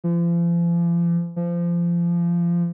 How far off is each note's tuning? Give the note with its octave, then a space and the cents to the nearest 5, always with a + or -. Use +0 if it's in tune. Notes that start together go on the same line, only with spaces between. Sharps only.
F3 -40
F3 -25